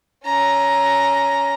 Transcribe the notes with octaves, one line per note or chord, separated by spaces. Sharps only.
C#4 A#5